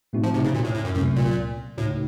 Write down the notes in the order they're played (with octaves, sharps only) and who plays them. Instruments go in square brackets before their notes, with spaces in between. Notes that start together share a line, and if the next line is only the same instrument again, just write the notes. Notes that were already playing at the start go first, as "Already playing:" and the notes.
[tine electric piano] A2 A3 C4 D#4 F#4
[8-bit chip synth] F3
C3
C#3
A#2
A2
A2
F#2
[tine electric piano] C#2 C3 F#3 A3 C4 [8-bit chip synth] F#2
[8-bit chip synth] A#2
[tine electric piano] C#2 C#3 A3 D#4 F#4 [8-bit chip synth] A2